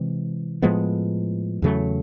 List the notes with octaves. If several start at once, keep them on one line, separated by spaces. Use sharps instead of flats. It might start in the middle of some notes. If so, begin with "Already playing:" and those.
Already playing: C3 E3 G#3 C4
A2 F3 G#3 B3
E2 C#3 F#3 A3